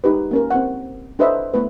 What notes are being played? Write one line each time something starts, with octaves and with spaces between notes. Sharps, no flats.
G#3 D#4 G4 B4
A#3 C#4 A#4
C4 F#5
D4 A4 B4 C5 D#5 E5
A3 B3 B4